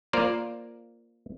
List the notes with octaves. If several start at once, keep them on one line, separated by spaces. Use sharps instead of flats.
A#3 F4 A#4 C5 D5